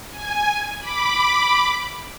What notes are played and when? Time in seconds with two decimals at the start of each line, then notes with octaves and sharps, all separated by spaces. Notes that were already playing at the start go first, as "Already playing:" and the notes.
0.10 G#5
0.79 B5 D6